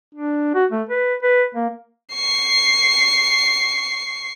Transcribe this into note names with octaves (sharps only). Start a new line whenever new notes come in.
D4
F#4
A3
B4
B4
A#3
C#6 C7